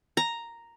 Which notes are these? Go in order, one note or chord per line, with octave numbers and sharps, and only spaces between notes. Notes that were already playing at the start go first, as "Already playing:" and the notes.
A#5